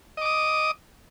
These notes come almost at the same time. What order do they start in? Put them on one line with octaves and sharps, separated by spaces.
D#5 D6 D#6